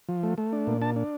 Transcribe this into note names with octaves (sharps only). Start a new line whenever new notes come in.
F3
A3
A3
D4
A#2
D4 A5
D4